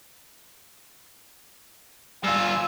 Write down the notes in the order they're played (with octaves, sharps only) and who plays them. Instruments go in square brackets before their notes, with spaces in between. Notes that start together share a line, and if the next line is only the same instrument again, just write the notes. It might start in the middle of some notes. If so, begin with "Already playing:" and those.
[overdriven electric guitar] G2 F4 [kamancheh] G#5 E6